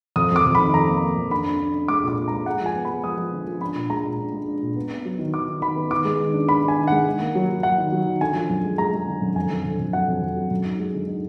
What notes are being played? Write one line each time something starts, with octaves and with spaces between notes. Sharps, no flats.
F2 D#6
F2 D6
F2
D#3 B5
F2 A#5
A#3
A#3
F2
D4 B5
D4
D4
D4
G#3 D6
A#2 D6
A#2
G#3 A#5
G#3 F#5
F3 G#5
B3
B5
G#3
F3 D#6
F3
D3
F3
D4 B5
A#2
G#3 A#5
A#2
D4
G#3
D4
A#2
B3
B3
F#3
D#3
D#3 D6
D#3
D#3 B5
B3
D#3 D6
G#3
D#3
D4
D4 B5
D4
G#5
D#3
G#3 F#5
D#3
A#3
F#3
F#3
F#3 F#5
D#3
F#3
D#3
D3 G#5
F3
F#2
G#3
G#3 A#5
G#3
D3
F#2
F2 G#5
D3
F2
F2
F#3 F#5
F2
F2
F#3
F#2
D#4
G#3
D3
D#4